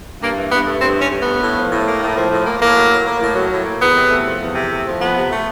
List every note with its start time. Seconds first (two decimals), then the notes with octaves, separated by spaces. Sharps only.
0.21 G2 A#3
0.37 E3
0.51 G2 B3
0.67 A3
0.81 G2 C4
0.96 E3
1.01 C#4
1.11 G2
1.21 A3 B3
1.41 A2
1.57 F3
1.71 A2
1.86 A#3
2.01 A2
2.16 F3
2.31 A2
2.46 A#3
2.61 A2 A#3
2.76 F#3
2.91 A2
3.05 A#3
3.21 A2
3.35 F#3
3.50 A2
3.65 A#3
3.80 E2 B3
3.96 C3
4.11 A3
4.26 F3
4.41 E2
4.55 C3
4.71 A3
4.86 F3
4.99 F2 B3
5.15 C3
5.30 A3